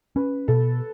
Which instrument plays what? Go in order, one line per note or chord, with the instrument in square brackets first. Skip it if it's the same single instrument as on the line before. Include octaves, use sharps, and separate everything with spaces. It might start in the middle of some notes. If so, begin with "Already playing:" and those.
[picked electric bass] C#4 [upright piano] B4
[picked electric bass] B2 [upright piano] A4